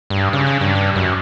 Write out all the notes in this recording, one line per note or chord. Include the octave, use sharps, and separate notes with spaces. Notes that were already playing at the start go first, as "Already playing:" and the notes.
G2
C#3
C#3
G2
G2
F#2